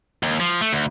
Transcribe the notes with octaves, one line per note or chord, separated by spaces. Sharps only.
D#2
F3
A3
D2